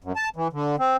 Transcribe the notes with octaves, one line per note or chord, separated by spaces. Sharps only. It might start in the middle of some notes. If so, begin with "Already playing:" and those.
F#2
A5
E3
D3
C4